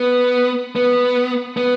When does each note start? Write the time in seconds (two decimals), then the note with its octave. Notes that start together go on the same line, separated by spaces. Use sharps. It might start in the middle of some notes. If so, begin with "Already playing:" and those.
Already playing: B3
0.76 B3
1.57 B3